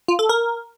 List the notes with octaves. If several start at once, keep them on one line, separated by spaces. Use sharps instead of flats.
F4
A4
A#4